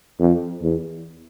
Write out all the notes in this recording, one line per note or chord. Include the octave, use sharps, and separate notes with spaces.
F2
E2